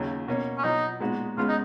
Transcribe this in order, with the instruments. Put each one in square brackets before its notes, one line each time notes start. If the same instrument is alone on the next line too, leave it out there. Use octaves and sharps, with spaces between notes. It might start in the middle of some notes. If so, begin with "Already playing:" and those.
Already playing: [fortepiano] D#2 C#3 F#3
B2 A#3 C#4
[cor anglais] C#4
[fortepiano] B2 F#3 B3 [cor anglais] D#4
[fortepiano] A#2 G#3 B3 D#4 F#4
[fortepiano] C#2 C#3 G#3 B3 [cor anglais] F4
[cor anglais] D#4